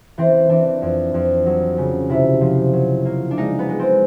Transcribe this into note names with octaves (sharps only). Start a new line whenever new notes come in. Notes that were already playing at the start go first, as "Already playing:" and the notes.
E3 C4
E3 D4
F2
F2
F#3
C#3
C3 E4
F3
F#3
A#3
D4
G#3 D#4
B3
G#3
C4